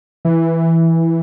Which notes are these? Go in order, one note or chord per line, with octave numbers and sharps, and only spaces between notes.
E3